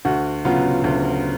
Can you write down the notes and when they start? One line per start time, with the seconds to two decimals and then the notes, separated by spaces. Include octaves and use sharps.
0.05 D2 F#4
0.45 C#3 F#3 B3 F4
0.84 D2